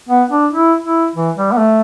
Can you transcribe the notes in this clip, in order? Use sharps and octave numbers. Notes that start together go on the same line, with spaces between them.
B3
D4
E4
E4
E3
G3
B3
A3